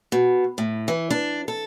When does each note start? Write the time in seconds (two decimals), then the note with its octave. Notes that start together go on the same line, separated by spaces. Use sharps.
0.12 B2
0.58 A2
0.88 E3
1.10 D4
1.48 A4